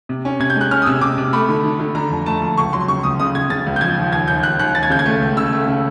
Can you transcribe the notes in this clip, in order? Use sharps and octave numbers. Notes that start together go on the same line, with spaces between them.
C3
C#4
C3 G#6
G6
G#3 F#6
C#4 F6
D#6
C3 E6
C3 D6
C3
A3 B5
D3
D3
D3
D3 A#5
F2
A3 A5
F2
C#2 C#6
F#3 C6
C#3 C#6
C#2 D#6
C#3 D#6
C#3 G#6
C#3 A6
C#2
G6
F3 G#6
D#2
D#2 G#6
D#2 G6
D#2 F#6
D#2 F#6
D#2 A6
G#6
C#3 G6
G#6
A3
C#2
C#3 E6
A3
C#3